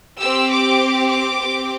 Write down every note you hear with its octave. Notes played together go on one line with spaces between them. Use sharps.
C4 G4 E6
D6
D6
C4 G4